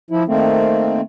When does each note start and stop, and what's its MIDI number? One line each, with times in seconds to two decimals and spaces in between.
0.11 0.23 53
0.11 0.23 64
0.27 1.01 51
0.27 1.01 57
0.27 1.01 58
0.27 1.01 60